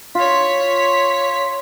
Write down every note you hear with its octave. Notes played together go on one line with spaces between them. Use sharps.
F4 C#5 B6